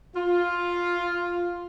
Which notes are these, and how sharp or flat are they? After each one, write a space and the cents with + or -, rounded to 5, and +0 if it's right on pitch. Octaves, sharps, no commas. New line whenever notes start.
F4 +5